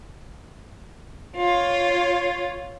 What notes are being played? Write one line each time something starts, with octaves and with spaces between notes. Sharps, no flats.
F4 C#5